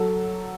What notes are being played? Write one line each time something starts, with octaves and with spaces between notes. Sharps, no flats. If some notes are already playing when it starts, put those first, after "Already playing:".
Already playing: F#3 A4